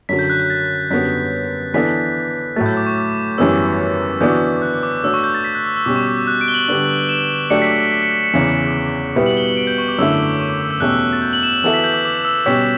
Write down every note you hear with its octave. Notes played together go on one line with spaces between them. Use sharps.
F#2 D3 F#3 B6
G6
F#6
F#6
A6
F#2 D3 G3 B3 F#4 B6
E3 B3 D4 A4 D5 B6
A2 F#3 A3 A6
G6
D6
C#6
D6
D6
F#2 E3 G3 B3 E6
E3 B3 D4 F#4 G6
F#6
D6
A3 D4 F#4 C#5 E6
C#6
G6
A6
B6
F#6
E6
E6
B2 G3 C#4 D6
C#6
D6
E6
F#6
D7
G7
F#7
D3 G3 B3 D4
E7
F#3 A3 D4 G4 D5 C#7
B6
C#7
B6
B6
C#7
B6
C#7
E2 C#3 E3
B2 G3 B3 E4 B4
F#7
G7
F#7
D7
G6
C#6
D6
F#2 D3 A3 E4 E6
D6
C#6
D6
D6
E6
E2 B2 A3 C#4 G4 F#6
E6
A6
G6
F#7
E7
F#7
E3 B3 F#4 A4 E5 F#7
B6
G6
D6
D6
E6
B2 G3 C#4 G4 C#5 B6